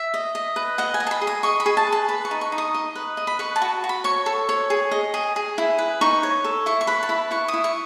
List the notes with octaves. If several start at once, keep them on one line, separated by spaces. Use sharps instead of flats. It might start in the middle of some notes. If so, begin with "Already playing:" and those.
Already playing: E5
D#5
D#5
B4
D#5 F#5
G#5
D#5
A5
B5
G#4
D#6
D#5 C#6
B5
G#4
A5
B4
A5
B4 B5
C#6
D#4
C#6
D#4
D#6
D#5
B4
D#5
B5
B4 C#6
A5
F#4
F#4
B5
C#5 C#6
A4
C#5
G#4
D#5
G#4
G#4
E4
B4
D#4 C#6
C#5
A4
E4 C#6
C#6
B4 B5
A5
E4 B5
E4 C#6
D#6
E4
C#6